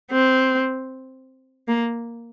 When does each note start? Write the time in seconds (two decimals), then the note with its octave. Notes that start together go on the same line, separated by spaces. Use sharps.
0.11 C4
1.68 A#3